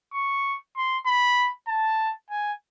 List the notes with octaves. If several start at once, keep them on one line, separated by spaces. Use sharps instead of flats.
C#6
C6
B5
A5
G#5